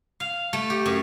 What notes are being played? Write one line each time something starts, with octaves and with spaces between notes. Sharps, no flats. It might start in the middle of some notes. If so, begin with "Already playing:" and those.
F5
A3
G4
F#2